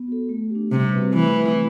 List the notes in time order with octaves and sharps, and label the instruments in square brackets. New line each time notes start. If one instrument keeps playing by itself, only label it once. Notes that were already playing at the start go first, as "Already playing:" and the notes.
Already playing: [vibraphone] B3
F#4 A4
A3
G4
D4
[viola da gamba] C3 [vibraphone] G3
[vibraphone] C4 F#4 B4
[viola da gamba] E3 [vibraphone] A3
[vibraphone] C4 E4 B4 E5